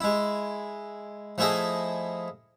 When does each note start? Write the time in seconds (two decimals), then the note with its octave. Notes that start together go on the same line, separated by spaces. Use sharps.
0.01 G#3 E4
1.38 F3 A3 E4 G#4 D#5 E5